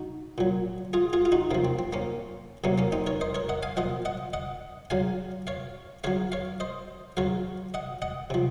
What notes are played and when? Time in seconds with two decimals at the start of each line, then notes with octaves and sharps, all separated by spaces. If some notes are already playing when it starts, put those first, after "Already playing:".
Already playing: D#4 F#4
0.38 A#2 F#3
0.93 F4 G#4
1.13 F4 G#4
1.25 F4
1.32 D#4 F#4
1.51 C3 F3 A#3
1.65 C4
1.79 C4
1.93 A#3 C#4
2.64 C3 F#3 A#3 C#4
2.78 A#3 C#4
2.92 C4 D#4
3.06 A#4 C#5
3.21 C5 D#5
3.35 A#4 C#5
3.49 D#5 F#5
3.63 F5 G#5
3.77 A#2 F3 D#5 F#5
4.05 D#5 F#5
4.33 D#5 F#5
4.90 C#3 F#3 F5 G#5
5.47 C#5 F5
6.04 C#3 F#3 C#5 F5
6.32 C#5 F5
6.60 C5 D#5
7.17 C#3 F#3 C#5 F5
7.74 D#5 F#5
8.02 D#5 F#5
8.30 C3 F3